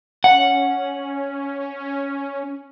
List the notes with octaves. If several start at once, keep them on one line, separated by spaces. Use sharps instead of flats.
C#4 F#5